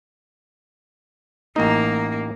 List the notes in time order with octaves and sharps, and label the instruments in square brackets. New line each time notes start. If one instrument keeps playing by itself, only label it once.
[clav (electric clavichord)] A1 D#4 [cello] A#3